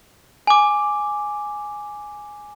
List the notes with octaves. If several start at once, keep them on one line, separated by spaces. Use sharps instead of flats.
G#5 D6